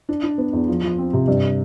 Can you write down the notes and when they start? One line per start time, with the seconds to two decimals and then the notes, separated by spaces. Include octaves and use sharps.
0.09 D4
0.23 D4
0.38 B3
0.53 E2
0.68 F3
0.83 F3
0.98 C4
1.13 C3
1.28 G2